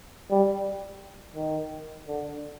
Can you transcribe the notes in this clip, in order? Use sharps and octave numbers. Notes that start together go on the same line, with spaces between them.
G3
D#3
D3